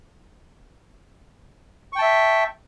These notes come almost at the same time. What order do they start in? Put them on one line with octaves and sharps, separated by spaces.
C#6 G5 A5 E5